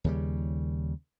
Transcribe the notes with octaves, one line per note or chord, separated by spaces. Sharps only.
D#2 C#3 G3